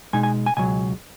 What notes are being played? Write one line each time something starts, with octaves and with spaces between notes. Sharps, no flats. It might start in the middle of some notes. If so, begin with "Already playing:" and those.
B2 G#3 D#4 G#5
G#5
G#5
C#2 B2 F#3 G#5